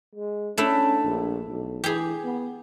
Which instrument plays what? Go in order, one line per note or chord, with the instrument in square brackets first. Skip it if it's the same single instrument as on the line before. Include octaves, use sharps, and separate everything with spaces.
[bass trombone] G#3
[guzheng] A3 D4 E4 [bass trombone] C#4
[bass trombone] A#1
B1
[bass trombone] E3 [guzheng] G4 G#4
[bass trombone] B3